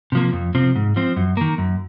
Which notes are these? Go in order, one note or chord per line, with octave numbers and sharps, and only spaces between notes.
C3 F3 A#3
F2
C3 F3 C4
G#2
F3 C4
F#2
D#3 A#3
F#2